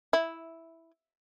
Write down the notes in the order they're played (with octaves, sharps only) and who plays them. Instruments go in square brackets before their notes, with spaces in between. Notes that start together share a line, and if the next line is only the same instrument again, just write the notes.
[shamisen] E4